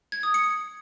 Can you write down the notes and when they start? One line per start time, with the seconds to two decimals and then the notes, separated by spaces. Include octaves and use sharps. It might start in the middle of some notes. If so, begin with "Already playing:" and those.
0.12 G#6
0.23 D#6
0.34 C#7